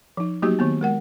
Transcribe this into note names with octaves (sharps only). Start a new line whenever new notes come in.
F3 D#4
F#3 A3 A#3 D#4 F#4 G4
D#3 A#3 B3
G#3 A#4 F#5